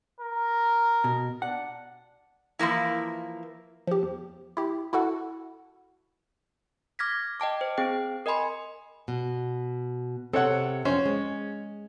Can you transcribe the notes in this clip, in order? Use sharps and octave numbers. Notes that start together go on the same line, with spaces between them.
A#4
B2
D4 F#5
E3 F3 A#3 E4
F3 G4
E2
E4 G4
E4 F#4 A4 F#5
D6 F6 G#6 A#6 B6
D#5 G5 A5 D6
C5
C4 G#4 G5
A#4 D#5 G#5 B5 C6
B2
C3 C4 A4 C#5 F#5
F2 C#4 C5
G#3